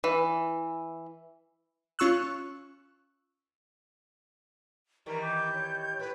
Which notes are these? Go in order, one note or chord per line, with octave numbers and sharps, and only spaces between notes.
E3
C#4 F4 C#6 E6 F#6
D#3 E3 G3 A#4 A#5
D6 G6
C#5
A2 B4